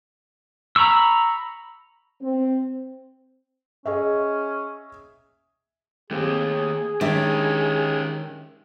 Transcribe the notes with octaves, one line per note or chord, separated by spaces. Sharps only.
A#5 B5 C#6 E6
C4
C#4 G#4 D#5 E5
D#2 A3 C4 G4 G#4
D#3 G#3 C#4 D4 G4 E5